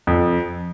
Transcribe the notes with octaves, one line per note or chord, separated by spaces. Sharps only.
F2